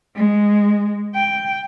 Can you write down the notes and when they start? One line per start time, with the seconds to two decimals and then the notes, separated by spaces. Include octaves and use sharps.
0.16 G#3
1.15 G5